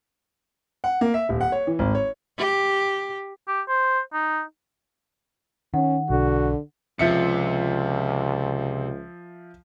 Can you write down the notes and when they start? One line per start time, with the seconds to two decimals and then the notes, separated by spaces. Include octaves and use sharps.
0.84 F#5
1.01 A#3
1.14 E5
1.29 D#1
1.41 F#5
1.52 C#5
1.67 E3
1.79 G#1
1.95 C#5
2.39 G4
3.48 G4
3.69 C5
4.13 D#4
5.74 D#3 C#4 F#5
6.10 B1 D3 F#4
6.99 C#2 C3 F3 E5 C#7